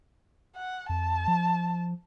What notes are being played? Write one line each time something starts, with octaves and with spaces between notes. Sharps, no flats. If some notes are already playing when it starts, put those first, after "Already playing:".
F#5
F2 A5
F3